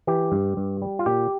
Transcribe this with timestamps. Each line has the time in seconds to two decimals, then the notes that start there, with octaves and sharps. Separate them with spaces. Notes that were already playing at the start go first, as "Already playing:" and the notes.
0.07 E3 G4
0.32 G2
0.57 G2
0.82 G3
0.99 F4
1.06 A#2 G4